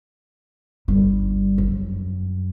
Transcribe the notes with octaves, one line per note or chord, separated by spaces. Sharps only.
G1 G3
F#2